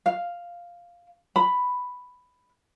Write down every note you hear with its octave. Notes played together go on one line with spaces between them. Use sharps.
F5
B5